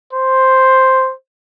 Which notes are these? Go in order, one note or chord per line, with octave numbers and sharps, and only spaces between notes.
C5